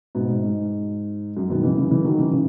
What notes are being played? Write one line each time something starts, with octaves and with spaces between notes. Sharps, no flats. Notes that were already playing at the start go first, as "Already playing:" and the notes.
G#2 B2
G#2
G#2
F#2
B2 D#3
C#3 E3
C#3 E3
C#3 E3
D#3 F#3
C#3 E3
C#3 E3